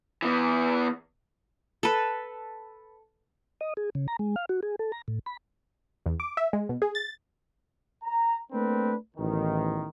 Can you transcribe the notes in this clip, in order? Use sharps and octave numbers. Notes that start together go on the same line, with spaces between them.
E3 B3
A4 B4
D#5
G#4
C#3
A#5
G#3
F5
F#4
G#4
A4
A#5
A2
B5
E2
D6
E5
G#3
B2
G#4
A6
A#5
A3 A#3 C4 D4 B4
A1 E2 D#3